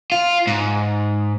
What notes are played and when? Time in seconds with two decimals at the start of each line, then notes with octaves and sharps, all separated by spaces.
0.12 F4
0.47 G#2